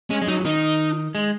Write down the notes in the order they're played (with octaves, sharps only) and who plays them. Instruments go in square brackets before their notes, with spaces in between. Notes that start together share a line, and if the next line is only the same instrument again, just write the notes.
[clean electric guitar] G#3 [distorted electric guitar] C#4
[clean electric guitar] G#3
[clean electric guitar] F#3 [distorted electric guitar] D#4
[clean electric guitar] D#3 [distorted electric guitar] D#4
[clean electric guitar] G#3